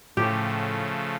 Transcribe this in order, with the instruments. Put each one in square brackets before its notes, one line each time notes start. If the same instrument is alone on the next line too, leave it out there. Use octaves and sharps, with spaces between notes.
[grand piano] A2 [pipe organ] C#3 F3 A3 [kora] G4